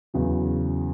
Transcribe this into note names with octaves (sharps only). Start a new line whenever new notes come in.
E2 C#3 F#3